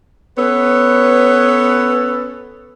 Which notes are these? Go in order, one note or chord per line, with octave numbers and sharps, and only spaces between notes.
B3 C#4 A4 B4 C#5